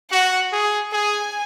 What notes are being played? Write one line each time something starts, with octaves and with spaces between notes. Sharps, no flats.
F#4 F#5
G#4
G#4 G#5